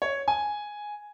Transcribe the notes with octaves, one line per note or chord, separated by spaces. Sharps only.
C#5
G#5